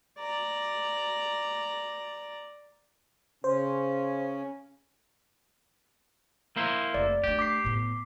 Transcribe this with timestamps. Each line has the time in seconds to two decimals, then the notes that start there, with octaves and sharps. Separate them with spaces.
0.18 D5 A#5
3.44 C#3 C#4 C5
6.56 A#3 E4 C5
6.94 F1 D5
7.24 A3 D4 G4
7.39 D6 B6 C7
7.64 A2 B3